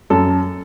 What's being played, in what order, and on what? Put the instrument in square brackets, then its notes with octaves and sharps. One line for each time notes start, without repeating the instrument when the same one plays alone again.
[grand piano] F#2 A4